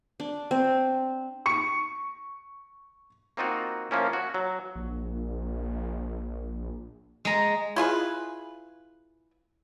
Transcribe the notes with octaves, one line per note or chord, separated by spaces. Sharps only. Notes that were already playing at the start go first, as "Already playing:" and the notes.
D4
C4
C#6 C#7
A#3 C4 D#4 F4 F#4
F3 A#3 C#4 E4
F#4
F#3
A#1
G#3 A#5
E4 F4 G#4 B4